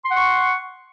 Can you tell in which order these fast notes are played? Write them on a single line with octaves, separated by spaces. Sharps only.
C6 F#5 C#6